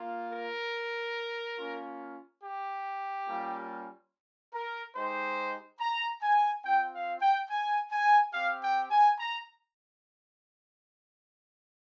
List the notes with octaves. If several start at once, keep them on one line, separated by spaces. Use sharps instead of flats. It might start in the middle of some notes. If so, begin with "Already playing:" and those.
Already playing: A#3 F4
A#4
A#3 C#4 F4
G4
G3 A#3 C#4 F4
A#4
G#3 D#4 G4 C5
A#5
G#5
C4 F4 G5
F5
G5
G#5
G#5
C4 G4 F5
G5
G#5
A#5